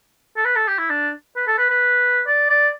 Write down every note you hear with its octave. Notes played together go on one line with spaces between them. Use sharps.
A4
B4
A4
G4
E4
D4
B4
A4
B4
B4
D5
D5